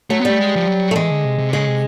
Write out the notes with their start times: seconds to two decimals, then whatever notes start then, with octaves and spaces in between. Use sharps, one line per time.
0.10 F#3 A3
0.20 B3
0.25 G3 A3
0.39 G#3
0.56 F3
0.67 F#3
0.91 A3
0.96 E3 G#3
1.10 D3
1.25 C3
1.39 C3
1.53 C#3 G#3
1.67 C3